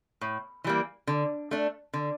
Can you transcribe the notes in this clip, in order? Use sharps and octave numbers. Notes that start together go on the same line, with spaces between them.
A2
E3 G3 A#3
D3
A3 D4
D3